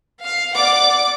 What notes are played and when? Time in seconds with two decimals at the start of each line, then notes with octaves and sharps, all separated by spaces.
0.24 F5
0.55 D5 F#5 D6